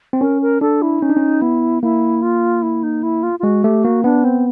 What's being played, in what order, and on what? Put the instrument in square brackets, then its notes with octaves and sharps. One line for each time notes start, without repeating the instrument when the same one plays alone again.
[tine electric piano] C4
[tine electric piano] C#4 [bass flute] A#4
[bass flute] A#4
[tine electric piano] D4 [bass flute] A4
[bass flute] E4
[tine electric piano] C#4 [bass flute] D#4
[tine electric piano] D4
C#4
[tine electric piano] B3 [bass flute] E4
[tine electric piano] A#3 [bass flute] E4
[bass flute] F4
E4
D#4
E4
F4
F4
[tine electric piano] G#3 [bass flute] F#4
[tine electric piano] A3 [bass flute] G4
[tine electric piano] A#3 [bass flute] F#4
[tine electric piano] B3 [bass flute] D4
[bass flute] C4